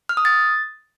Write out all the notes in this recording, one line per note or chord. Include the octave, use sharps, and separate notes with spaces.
F6
D#6
A6